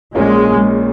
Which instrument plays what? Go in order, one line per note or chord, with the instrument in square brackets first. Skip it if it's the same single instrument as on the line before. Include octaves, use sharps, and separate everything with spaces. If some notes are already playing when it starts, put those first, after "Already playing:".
[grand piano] A#1 A#2 A#3 C#4 [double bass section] G#3